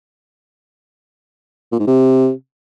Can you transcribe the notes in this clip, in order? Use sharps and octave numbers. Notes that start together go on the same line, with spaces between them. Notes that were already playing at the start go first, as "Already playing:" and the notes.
A#2
G#2
C3